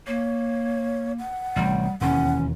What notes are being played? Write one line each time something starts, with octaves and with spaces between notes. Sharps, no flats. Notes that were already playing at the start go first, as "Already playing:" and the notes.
A#3 C#5
F#5
A1 C3 G3
E1 D#2 E3 C#4 F#5